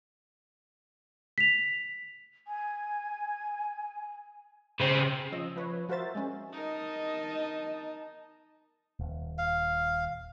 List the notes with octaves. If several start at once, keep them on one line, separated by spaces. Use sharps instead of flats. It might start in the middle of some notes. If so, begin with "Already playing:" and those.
B6 F7
G#5
C#3 C4
F3 C#4 D#5 E6
F3 B4 C#5
F3 F#4 A#4 C5 E5 A6
G#3 C#4
D#4 A#4 D#5 A5
D#1
F5